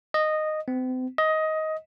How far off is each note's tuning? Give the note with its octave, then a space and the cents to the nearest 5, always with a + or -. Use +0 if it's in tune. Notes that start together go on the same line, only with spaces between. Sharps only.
D#5 -10
C4 -40
D#5 +15